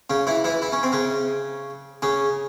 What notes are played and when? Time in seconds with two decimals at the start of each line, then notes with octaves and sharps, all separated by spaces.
0.10 C#3 C#4
0.27 E3 E4
0.44 E3 E4
0.62 E4
0.72 C#4
0.83 C4
0.92 C#3 C#4
2.02 C#3 C#4